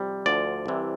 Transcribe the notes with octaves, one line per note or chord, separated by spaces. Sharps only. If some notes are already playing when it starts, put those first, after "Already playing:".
Already playing: F2 C3 G3
D2 D3 F3 D5
C2 C3 E3